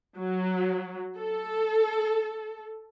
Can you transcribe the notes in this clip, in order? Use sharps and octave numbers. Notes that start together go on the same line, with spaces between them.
F#3
A4